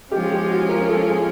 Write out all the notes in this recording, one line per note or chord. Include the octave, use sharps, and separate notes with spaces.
F3 G#3 C#4 F4 G4
G4
F#4
A#4
A4
G#4